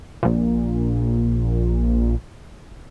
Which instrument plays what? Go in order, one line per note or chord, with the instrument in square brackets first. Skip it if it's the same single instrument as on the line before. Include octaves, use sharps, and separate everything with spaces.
[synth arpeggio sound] A#1 A#2